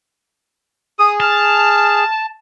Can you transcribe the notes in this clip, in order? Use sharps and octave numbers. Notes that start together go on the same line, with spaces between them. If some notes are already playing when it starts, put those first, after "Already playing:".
G#4 D#6
A5 F6